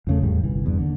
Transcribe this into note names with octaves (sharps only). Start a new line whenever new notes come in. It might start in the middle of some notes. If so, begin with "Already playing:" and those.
E2 C#3 A3
E2 A2 G3
G1 C2 E3
E2 G2
D#2 D3